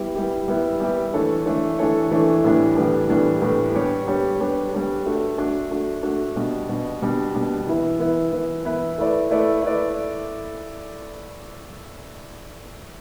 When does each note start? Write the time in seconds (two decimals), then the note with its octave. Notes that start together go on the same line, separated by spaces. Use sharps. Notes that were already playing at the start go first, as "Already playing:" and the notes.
Already playing: G3 B3 E4 G4
0.15 G3 B3 E4 G4
0.48 G3 B3 E4 G4
0.80 G3 B3 E4 G4
1.13 E3 A3 D4 A4 C#5
1.46 E3 A3 D4 A4 C#5
1.79 E3 A3 D4 A4 C#5
2.11 E3 A3 D4 A4 C#5
2.44 A2 E3 G3 B3 D4
2.76 A2 E3 G3 B3 D4
3.09 A2 E3 G3 B3 D4
3.41 A2 E3 G3 B3 D4
3.74 G3 B3 D4 G4 C#5
4.07 G3 B3 D4 G4 C#5
4.40 G3 B3 D4 G4 C#5
4.73 G3 B3 D4 G4 C#5
5.06 A3 D4 F#4
5.38 A3 D4 F#4
5.71 A3 D4 F#4
6.03 A3 D4 F#4
6.36 B2 G3 D4
6.69 B2 G3 D4
7.02 B2 G3 D4
7.34 B2 G3 D4
7.67 E3 B3 E4 B4
7.99 E3 B3 E4 B4
8.32 E3 B3 E4 B4
8.65 E3 B3 E4 B4
8.98 A3 E4 B4 D5
9.31 A3 E4 B4 D5
9.62 A3 E4 B4 D5